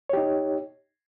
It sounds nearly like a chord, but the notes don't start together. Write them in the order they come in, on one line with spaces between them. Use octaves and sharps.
C#5 G4 D#4